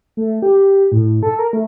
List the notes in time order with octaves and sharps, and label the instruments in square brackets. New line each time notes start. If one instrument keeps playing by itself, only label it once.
[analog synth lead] A3
G4
A2
A4
A#4
A3